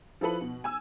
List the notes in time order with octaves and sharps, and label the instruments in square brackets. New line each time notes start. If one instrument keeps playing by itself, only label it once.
[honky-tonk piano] F3 E4 A4 B4 F#7
B2
G#5 E6